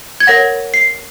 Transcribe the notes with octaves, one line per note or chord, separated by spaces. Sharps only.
G#6
A#4 C#5 F#5 A#6
C7